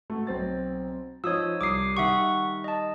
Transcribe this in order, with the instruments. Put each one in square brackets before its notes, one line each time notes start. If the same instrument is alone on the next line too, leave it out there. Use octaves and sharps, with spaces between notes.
[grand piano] A3 F#4
B1 C4 A6
[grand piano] F3 D#4 C5 [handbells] C#5 D#6 E6
[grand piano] C2 [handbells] D6 D#6 C7
[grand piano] D#3 G3 [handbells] E5 F#5 C#6
[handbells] D#5 A5